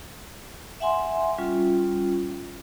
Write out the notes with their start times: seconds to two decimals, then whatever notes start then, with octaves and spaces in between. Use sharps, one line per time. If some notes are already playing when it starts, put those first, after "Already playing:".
0.80 E5 F#5 G#5 C6
1.38 G3 C#4 F4